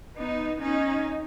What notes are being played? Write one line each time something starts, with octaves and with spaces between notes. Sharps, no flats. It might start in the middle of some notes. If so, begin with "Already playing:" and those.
B3 D#4
C#4 D#4